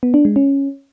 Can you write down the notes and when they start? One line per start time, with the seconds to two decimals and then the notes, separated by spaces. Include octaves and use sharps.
0.03 B3
0.14 D4
0.25 G#3
0.36 C#4